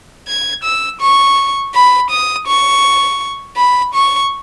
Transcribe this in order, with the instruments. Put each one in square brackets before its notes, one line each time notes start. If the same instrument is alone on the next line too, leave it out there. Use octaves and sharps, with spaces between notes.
[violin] G#6
E6
C#6
B5
D#6
C#6
B5
C#6